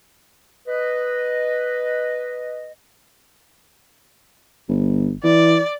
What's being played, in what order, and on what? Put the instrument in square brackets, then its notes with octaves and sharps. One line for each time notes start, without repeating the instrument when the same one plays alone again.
[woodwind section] B4 D#5
[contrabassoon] G1
[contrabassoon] E3 [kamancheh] D5